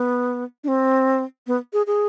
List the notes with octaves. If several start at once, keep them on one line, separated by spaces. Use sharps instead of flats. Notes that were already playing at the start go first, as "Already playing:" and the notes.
Already playing: B3
D4
C4
B3
G#4
G#4